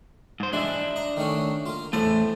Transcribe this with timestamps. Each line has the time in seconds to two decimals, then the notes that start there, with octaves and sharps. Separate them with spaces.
0.40 G#2 C5
0.53 E3 G#3 D4 E5
0.96 D#5 A#5
1.17 D#3 A3 C#4
1.66 A#3 F4
1.93 E2 A2 E3 A3 C5